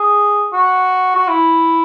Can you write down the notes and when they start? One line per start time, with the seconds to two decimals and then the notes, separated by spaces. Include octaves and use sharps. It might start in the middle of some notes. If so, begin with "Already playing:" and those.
Already playing: G#4
0.53 F#4
1.16 F#4
1.28 E4